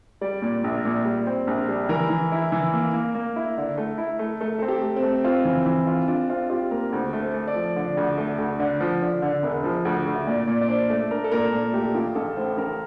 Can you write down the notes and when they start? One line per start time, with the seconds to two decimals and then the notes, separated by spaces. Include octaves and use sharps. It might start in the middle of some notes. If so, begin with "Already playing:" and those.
0.21 G3 D5
0.42 A#2
0.64 A#1
0.85 A#2
1.05 G3
1.27 C4
1.47 A#1
1.68 G3
1.89 E3 A#4
2.10 E3
2.32 E4
2.52 E3
2.73 A#3
2.93 A#3
3.15 A#3
3.36 E4
3.57 D3
3.78 A3
3.98 E4
4.19 A3
4.41 A3 A4
4.59 C4 A4
4.68 G4
4.82 A3
4.96 C4
5.03 A3
5.24 C4 F4
5.45 E3
5.66 E3
5.87 F4
6.08 D4 F4
6.29 C4 F4
6.50 F4 G4
6.71 A#3 A#4
6.92 D2 C5
7.13 A3
7.20 C5
7.34 A3
7.47 D5
7.54 F3
7.76 D3
7.97 D2
8.17 A3
8.38 D2
8.59 D3
8.81 F3
9.02 D3
9.22 D3
9.43 E1
9.64 F3
9.85 D2
10.06 D2
10.15 E5
10.27 A#2 D5
10.48 A#2
10.61 D5
10.68 D4 C5
10.90 A3
11.11 D4 A#4
11.24 A4
11.32 A#2 A#4
11.53 A#2
11.73 A3 G4
11.94 A1 F4
12.15 A1 A4
12.36 A2 C5
12.57 A1 A#4